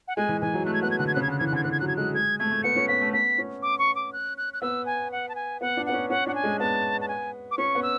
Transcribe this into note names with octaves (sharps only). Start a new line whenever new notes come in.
F#5
G#3 G#5
E3
E3 G#5
F#3
A3 F#6
G#6
B3 F#6
G#6
D3 F#6
G#6
C#3 F#6
G#6
D3 F#6
E3 G#6
F#6
D3 G#6
E3 F#6
G#6
F#3 F#6
G#6
G#3 F#6
G#3 G#6
A3 G#6
A3
B3 C#7
C#4
B3 B6
A3
B3 B6
C#4
D6
C#6
D6
F#6
F#6
F#6
B3 E6
G#5
F#5
A5
G#5
B3 F#5
D4
B3 F#5
C#4
C#4 F#5
D4 F#5
G#5
G#3
B3 A5
A5
G#5
D6
C#4 C#6
B3
E6